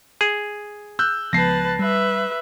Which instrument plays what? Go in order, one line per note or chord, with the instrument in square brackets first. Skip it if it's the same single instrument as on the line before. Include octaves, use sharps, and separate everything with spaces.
[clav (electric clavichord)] G#4
[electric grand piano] E6 F#6 G6
[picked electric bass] C#2 F3 B3 [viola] B4 A5 [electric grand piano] A#6 C7
[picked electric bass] G3 [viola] B4 E5